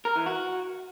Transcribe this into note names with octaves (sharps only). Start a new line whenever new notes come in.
A#4
E3
F#4